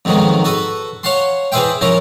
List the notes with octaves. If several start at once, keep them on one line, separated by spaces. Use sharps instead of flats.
F2 G#2 D#3 F#3 B3
F#4 A4 B4
C#5 F5 F#5 A5 C6
E3 G#4 B4 C5 E5 G5
F3 C#4 E4 F4 A#4